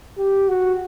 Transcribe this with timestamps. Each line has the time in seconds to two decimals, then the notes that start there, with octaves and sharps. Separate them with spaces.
0.18 G4
0.48 F#4